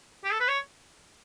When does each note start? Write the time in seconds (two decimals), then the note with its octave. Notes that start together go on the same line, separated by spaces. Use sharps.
0.24 G4
0.32 A4
0.40 B4
0.48 C#5